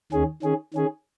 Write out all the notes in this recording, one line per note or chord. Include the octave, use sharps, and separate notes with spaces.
D#2 D#3 C#4 G#4
D#3 C#4 G#4
D#3 C#4 G#4